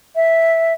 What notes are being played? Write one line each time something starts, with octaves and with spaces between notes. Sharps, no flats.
E5